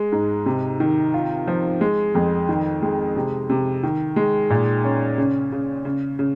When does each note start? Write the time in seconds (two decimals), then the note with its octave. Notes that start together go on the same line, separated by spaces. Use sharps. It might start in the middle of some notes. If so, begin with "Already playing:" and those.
Already playing: G#3
0.12 G#2
0.46 C3
0.80 D#3
1.14 F4
1.48 F3
1.81 G#3
2.15 F2
2.49 D#3
2.82 G#3
3.16 C3
3.50 C3
3.83 D#3
4.16 G#3
4.50 A#2
4.84 C#4
5.18 C#3
5.52 C#3
5.85 C#3
6.19 C#3